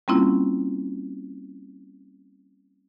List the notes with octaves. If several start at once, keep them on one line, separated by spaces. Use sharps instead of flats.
G3 A#3 C4 C#4 E4 F4